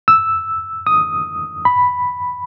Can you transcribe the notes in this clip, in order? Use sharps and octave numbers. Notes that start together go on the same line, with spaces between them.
E6
D#6
B5